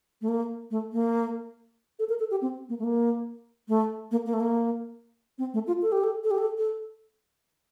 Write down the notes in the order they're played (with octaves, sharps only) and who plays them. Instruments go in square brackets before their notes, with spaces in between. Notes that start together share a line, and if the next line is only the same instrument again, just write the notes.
[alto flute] A3
A#3
A3
A#3
A4
A#4
A4
G4
C4
A#3
A3
A#3
A3
A#3
A#3
A3
A#3
C4
A3
F4
A4
G4
A4
A4
G4
A4
A4